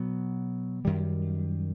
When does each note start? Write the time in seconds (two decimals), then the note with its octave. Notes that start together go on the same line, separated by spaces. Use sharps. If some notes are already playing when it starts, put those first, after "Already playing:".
Already playing: B2 F#3 B3
0.85 F#2 D#3 G3